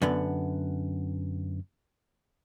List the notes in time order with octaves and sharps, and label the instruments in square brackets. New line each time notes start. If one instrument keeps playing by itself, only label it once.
[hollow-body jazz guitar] F#2 D3 B3